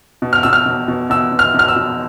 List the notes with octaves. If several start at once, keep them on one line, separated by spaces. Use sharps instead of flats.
B2
F6
B2 E6
F6
B2
B2
B2 E6
B2
F6
B2 F6
E6
B2